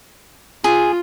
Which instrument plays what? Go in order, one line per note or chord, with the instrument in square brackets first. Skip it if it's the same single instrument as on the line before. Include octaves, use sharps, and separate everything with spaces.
[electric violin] F4 [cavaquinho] G#4